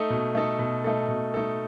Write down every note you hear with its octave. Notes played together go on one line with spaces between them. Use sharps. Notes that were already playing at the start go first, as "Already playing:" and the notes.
Already playing: A3 D#4 A4
B2
A3 D#4 A4
B2
A3 D#4 A4
B2
A3 D#4 A4